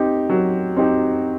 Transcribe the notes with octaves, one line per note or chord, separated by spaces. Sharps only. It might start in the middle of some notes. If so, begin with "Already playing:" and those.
Already playing: C4 D#4 G4
F#3
C4 D#4 G4